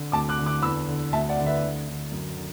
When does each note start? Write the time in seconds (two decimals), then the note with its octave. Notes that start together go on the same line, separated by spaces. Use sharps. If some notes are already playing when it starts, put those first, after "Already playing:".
Already playing: D3
0.12 D2 A5 D6
0.29 D6 F#6
0.38 D3
0.46 D6 F#6
0.62 E2 B5 E6
0.88 D3
1.12 D2 E5 A5
1.29 D5 F#5
1.38 D3
1.46 B4 E5
1.62 D2
1.88 D3
2.12 F#2
2.37 D3